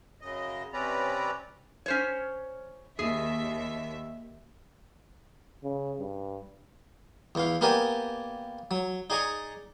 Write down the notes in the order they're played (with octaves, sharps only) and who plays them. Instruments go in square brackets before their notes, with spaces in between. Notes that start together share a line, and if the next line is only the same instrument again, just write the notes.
[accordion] F#2 C#3 D#5
C3 C4 C#4 B4 D5 A#5
[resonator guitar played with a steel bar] C#4 C5 C#5
[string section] D#2 E5 [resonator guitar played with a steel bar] G#4
[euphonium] C#3
G2
[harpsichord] E2 E3 F5
A#3 B3 G4 A#4 D5 G#5
F#3
D#4 G#4 D5 G#5 A#5 C#6